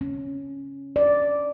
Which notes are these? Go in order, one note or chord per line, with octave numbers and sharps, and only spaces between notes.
C#4
D5